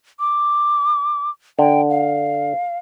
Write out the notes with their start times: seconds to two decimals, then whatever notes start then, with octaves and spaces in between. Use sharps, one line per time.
0.20 D6
1.59 D3 G5
1.90 F5